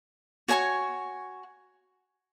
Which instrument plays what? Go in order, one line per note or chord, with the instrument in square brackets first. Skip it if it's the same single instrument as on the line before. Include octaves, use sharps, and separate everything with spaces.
[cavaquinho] F#4 C#5 G#5 C#6